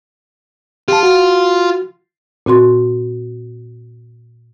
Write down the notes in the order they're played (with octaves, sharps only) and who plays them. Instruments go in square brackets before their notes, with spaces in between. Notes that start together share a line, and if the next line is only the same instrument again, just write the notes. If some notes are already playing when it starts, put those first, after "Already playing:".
[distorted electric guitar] F4 [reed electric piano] G4 A5
[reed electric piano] F#4
[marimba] A#2 C4 F#4 C6